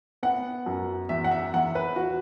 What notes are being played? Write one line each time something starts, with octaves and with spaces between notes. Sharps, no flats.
B3 F#5
F#2
E2 E5
F#5
E5
E2 F#5
B4
F#4